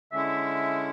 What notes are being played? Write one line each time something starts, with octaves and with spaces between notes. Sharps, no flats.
D3 G#3 C#4 E4 E5